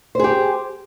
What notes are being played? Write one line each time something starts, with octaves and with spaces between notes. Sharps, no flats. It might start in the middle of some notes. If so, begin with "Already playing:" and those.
G4 G#4 C5